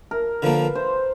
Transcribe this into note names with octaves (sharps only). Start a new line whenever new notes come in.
A#4
D3 F3 A#3 B4
C5